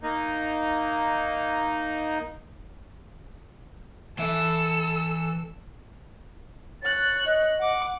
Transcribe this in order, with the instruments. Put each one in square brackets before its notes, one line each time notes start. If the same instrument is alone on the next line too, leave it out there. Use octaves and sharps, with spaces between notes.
[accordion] A#3 D#4
[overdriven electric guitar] E3 E5 [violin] A4 E6
[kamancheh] C#5 F#6 [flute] A6
[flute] D#5
[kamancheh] F#5 D6